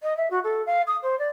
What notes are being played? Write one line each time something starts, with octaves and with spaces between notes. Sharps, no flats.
D#5
E5
F#4
A4
F5
D#6
C5
D5